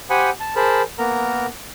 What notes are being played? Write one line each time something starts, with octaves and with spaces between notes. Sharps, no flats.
G4 C5 F#5 G#5 B5 D#6
A5
G#4 A#4 C5 A5 B5
A#3 B3 A#4 A#5